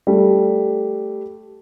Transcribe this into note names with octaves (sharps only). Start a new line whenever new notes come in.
G3 A3